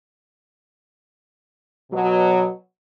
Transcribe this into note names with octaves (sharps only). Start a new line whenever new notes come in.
B2 F#3